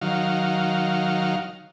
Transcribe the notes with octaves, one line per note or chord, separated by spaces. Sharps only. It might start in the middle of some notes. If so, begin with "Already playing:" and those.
D#3 F#3 F5